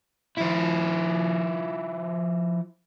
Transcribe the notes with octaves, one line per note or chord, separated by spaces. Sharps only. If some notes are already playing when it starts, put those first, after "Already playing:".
F3 E4